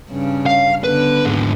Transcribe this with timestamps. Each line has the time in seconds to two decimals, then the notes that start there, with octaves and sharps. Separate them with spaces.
0.11 G2 C#3 C#4
0.46 F5
0.84 D3 B3 B4
1.25 D#2 G#2